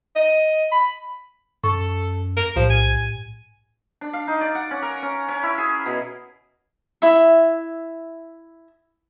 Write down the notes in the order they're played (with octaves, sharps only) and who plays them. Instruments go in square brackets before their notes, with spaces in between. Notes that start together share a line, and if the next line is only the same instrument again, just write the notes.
[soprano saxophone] D#5
B5
[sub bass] F#2 [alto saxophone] A4 [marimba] C#6
[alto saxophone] A#4
[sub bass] B1 [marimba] A2 [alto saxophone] F3
[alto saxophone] G#5
[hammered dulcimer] D4
F5
D#4
D5
F#5
C#4
A#4
C#4
C#4
E4
G#4
B2
[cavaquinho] E4 E5